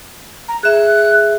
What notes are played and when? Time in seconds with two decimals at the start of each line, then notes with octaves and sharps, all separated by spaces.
0.49 A#5
0.63 G#4 E5 F#6